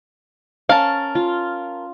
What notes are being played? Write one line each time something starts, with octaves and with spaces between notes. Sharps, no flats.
C#4 A#4 F5 A5
F4